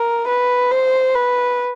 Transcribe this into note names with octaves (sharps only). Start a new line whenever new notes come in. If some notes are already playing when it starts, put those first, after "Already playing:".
Already playing: A#4
B4
C5
B4